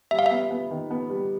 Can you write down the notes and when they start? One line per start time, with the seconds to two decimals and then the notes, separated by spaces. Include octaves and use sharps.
0.11 G3 E5
0.19 F5
0.26 E5
0.31 B3
0.51 B3
0.70 D#3
0.91 B3
1.09 G3